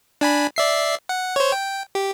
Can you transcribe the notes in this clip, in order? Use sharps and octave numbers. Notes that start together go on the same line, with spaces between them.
D4 G#5 B5
D5 E5 C7
F#5
C5 C#5
G5
G4